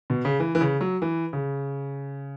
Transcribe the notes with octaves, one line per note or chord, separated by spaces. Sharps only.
B2
C#3
E3
E3
C#3
F#3
E3
C#3